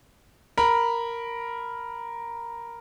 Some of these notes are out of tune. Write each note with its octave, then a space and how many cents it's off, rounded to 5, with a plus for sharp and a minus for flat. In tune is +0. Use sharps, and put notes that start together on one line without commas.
A#4 +0 B5 -5